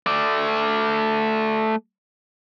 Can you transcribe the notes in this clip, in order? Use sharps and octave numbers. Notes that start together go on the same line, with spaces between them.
A3 D5